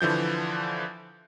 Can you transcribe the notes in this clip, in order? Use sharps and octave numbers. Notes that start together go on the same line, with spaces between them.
D3 E3 F3 G6